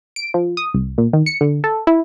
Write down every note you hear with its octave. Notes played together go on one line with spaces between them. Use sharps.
D7
F3
D#6
C2
A#2
D#3
C#7
D3
A4
E4